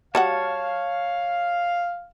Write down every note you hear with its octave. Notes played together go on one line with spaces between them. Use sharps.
G3 F#4 C#5 F5 F#5 A5